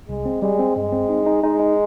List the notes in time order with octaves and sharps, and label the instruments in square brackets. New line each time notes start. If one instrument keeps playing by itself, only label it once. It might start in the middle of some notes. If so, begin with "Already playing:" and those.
[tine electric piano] C2 [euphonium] G#3
[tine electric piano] C4
[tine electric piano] G3 [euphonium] G#3
[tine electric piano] C4
[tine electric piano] G2 [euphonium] G#3
[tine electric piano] C4
D#4
D#4
[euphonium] G#3 [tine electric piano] D#4
[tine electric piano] D#4